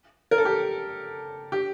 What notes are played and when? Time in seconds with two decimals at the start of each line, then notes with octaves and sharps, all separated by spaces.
0.31 A#4
0.38 A4
0.45 G4
1.52 G4